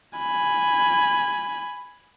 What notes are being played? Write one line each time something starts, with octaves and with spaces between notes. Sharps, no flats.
G#5 B5